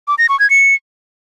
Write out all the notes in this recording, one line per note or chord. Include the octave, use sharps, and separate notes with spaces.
D6
A#6
C#6
G#6
C#7